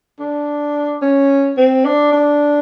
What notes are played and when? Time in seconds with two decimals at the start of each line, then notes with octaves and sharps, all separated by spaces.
0.20 D4
1.02 C#4
1.57 C4
1.85 D4
2.12 D4